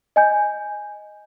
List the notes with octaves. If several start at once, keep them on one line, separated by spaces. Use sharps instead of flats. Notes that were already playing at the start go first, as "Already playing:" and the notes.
D#5 G#5 G6